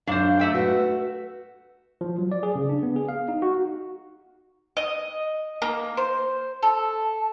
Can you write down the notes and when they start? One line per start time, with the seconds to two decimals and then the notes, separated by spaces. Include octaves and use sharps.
0.07 F#2 D4 C5 F5
0.39 A3 E5 G5
0.55 F#4 B4
2.01 F3
2.19 F#3
2.32 D5
2.43 G#4
2.55 C#3
2.69 D4
2.83 B3
2.96 G#4
3.09 F5
3.28 D#4
3.42 F#4
4.77 D#5
5.62 A#3
5.97 C5
6.63 A4